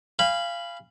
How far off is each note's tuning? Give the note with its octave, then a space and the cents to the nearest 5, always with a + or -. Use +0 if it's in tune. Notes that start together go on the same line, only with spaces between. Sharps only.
F5 -20 G#5 -35 B5 +0